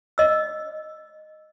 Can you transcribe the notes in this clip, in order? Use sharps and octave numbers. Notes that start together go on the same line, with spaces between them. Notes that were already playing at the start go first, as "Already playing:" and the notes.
D#5 E6